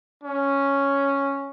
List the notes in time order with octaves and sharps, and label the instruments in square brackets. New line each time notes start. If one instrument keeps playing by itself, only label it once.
[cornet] C#4